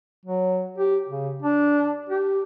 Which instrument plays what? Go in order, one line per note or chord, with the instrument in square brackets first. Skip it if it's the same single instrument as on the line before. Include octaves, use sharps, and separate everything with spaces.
[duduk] F#3
G4
C#3
D4
G4